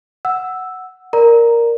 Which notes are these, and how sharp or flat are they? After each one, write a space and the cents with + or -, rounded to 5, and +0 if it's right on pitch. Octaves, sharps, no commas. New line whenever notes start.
F#5 +0 E6 +0
A#4 +0 D5 +0 A#5 +0